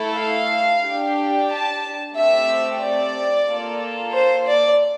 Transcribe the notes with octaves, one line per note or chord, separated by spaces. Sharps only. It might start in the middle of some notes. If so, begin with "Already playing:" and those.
Already playing: A3 E4 A4
F5
D4 G4
A5
A3 C4 G4 E5
D5
A#3 F4 A4
C5
D5